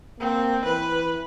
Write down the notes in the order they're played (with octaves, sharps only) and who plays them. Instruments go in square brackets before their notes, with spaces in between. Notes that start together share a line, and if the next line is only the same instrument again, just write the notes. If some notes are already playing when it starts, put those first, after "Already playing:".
[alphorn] A#3 [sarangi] C4
[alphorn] E3 [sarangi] B4